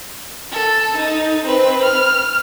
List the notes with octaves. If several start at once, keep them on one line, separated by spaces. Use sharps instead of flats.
A4
D#4
C4 B4
F6